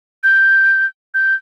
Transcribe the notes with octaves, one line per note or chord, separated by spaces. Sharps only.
G6
G6